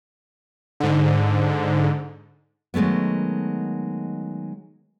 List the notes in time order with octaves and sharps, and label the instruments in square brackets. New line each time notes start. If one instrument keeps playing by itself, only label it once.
[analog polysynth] G#2 D3
[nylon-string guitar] D#3 F#3 G#3 A3 B3